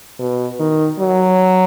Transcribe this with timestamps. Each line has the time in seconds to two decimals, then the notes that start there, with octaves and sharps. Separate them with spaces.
0.19 B2
0.59 D#3
1.00 F#3